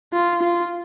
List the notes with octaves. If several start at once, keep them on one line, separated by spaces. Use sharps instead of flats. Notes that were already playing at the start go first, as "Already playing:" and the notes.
F4
F4